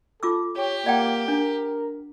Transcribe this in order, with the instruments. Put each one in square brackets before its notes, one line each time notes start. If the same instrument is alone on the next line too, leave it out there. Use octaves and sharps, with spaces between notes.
[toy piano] F4 D6 E6 [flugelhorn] A4
[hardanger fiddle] G4 [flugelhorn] C#5
[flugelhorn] A#3 [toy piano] D5 F#5 G5
[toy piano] D4 [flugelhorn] A#4